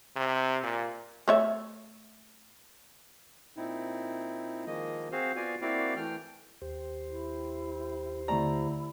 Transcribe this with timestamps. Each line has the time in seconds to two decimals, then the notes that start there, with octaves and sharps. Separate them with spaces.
0.16 C3
0.63 A#2
1.28 A3 C#5 E5
3.57 A#2 C4 D#4 E4
4.66 D#3 F3 G#3 A#3 D#5
5.12 C4 F#4 G#4 C5 F5
5.36 B3 F4 F#4 D5 F5 G#5
5.61 A#3 C4 E4 F#4 D5 F5
5.96 E3 A3 G5 F6
6.62 D#2 G4 C5
7.09 E4
8.28 D3 A3 E4 D5 A#5